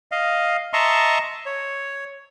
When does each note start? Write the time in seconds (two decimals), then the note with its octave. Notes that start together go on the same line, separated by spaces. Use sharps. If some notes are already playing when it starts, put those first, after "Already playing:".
0.12 D#5 F5
0.73 D#5 E5 A5 A#5 C6 C#6
1.46 C#5